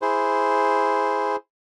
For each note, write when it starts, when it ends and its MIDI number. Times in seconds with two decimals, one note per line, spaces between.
0.02 1.36 64
0.02 1.36 68
0.02 1.36 72